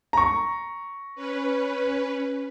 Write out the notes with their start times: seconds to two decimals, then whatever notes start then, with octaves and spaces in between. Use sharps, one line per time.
0.13 A#5 C#6
1.15 C#4 B4